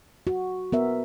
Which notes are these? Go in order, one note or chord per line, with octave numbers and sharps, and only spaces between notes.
F#4
B3 A#4 E5